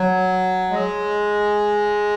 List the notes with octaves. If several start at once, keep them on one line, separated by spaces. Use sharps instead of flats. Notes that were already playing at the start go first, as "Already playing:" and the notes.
Already playing: F#3
G#3